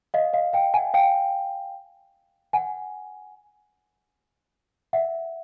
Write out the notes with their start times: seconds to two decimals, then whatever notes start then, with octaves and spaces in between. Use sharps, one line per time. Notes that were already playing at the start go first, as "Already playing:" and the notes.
0.14 D#5 F5
0.33 D#5 F5
0.53 F5 G5
0.74 F#5 G#5
0.94 F5 G5
2.53 F#5 G#5
4.93 E5 F#5